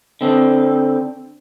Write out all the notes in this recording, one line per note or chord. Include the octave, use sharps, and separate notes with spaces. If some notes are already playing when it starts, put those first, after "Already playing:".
D3 C4